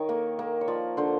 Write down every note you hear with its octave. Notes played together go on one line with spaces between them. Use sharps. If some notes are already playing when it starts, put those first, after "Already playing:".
Already playing: D#3 C#5
A#3
A#3
C#5
F3 D5
D3 C5